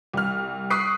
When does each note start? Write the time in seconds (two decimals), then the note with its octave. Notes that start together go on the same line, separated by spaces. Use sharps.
0.13 C2 F6
0.70 C#6 D#6 F#6 B6 C7 D7